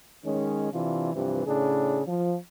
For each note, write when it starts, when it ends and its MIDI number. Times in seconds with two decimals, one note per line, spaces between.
0.25 0.69 51
0.25 0.69 56
0.25 0.69 61
0.73 1.11 48
0.73 1.11 52
0.73 1.11 62
0.73 1.11 65
1.15 1.43 43
1.15 1.43 48
1.15 1.43 52
1.15 1.43 53
1.46 2.02 45
1.46 2.02 49
1.46 2.02 62
1.46 2.02 68
2.07 2.37 53